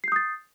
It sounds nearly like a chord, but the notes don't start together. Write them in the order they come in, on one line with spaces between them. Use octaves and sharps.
C7 G6 D#6 A6